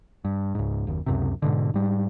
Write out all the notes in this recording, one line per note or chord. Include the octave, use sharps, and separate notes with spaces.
G2
C#2 G#2
F#1 D#2
C#2 F#2 C3
G#2 B2 D3
G#2 G3